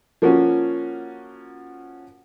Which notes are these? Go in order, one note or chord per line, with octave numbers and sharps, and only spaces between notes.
F3 A#3 C#4 F#4